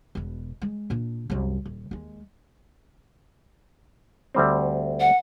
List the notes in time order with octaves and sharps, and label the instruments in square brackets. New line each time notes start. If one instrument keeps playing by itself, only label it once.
[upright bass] E1 B2
G#3
A#2 D4
C2 F#2
D#1
D#2 G#3
[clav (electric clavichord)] D2 G3 C4
[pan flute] F#5